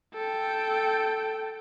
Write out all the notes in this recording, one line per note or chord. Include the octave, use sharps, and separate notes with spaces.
A4 G5